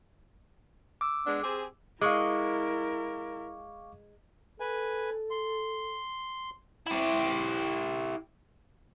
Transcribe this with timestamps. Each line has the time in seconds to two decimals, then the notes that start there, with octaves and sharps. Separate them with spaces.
1.01 D6 E6
1.26 G#3 B3 D4
1.43 C4 G4 G#4
2.01 G#3 E4 A#4 F5 C#6 D6
4.60 A4 B4 G#5
5.31 C6
6.86 E4 G4